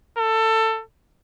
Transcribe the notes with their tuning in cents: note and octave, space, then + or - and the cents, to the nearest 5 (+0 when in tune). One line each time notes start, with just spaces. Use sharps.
A4 +20